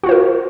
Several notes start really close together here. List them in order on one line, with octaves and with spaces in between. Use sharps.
F#4 F4 C5 A#4